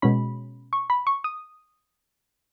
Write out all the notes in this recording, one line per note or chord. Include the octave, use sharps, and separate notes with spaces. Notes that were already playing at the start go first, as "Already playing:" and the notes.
B2 G#3 C#4 B5
C#6
B5
C#6
D#6